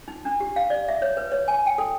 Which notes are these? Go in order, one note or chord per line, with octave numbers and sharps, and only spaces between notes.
D#4
D4
G4
F5
D5
E5
C#5
B4
C#5
G#5
G5
A4